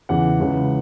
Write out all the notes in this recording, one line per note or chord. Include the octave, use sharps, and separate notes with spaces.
E2 C#3 E3 F#5
C#2 C#3 E3